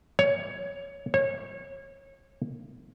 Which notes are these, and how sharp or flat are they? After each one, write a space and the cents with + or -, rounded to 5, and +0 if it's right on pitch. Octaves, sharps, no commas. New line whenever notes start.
C#5 +15
C#5 -25